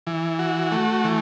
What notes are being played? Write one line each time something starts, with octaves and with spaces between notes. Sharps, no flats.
E3
F#4
A3
E3